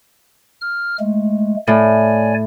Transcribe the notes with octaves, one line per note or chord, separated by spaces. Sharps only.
F6
G#3 A3
A2 C#5 D5 G#5